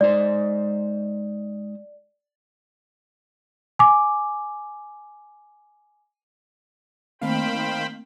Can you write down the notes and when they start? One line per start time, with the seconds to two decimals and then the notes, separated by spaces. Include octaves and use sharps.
0.01 G#3 D#4 C5 D5
3.79 G#5 D6
7.22 D#3 A3 A#3 C4 C5 F5 G5 B5